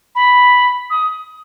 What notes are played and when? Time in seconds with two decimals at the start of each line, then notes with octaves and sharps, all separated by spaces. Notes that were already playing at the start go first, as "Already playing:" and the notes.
0.15 B5
0.90 D#6